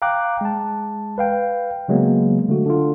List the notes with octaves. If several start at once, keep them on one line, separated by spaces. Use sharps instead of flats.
F5 G5 A#5 D6 F#6
G#3 A5
B4 F5 G5
C#3 F#3 G#3 A#3 B3
D3 A3 F#4
D3 F4